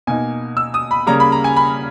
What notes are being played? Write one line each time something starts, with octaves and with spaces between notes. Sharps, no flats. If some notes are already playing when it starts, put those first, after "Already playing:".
B2 A#3 D#4 G#5
E6
D#6
B5
C#3 G3 A#3 C#4 A#5
B5
A#5
G#5
B5